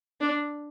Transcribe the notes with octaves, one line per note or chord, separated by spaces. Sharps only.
D4